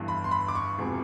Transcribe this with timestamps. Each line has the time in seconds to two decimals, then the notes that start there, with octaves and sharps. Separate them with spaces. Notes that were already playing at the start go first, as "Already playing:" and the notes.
Already playing: G1 G2 E3
0.08 B5
0.24 C6
0.31 B5
0.48 D6
0.55 C#6
0.78 E1 E2 C3 F3 G#3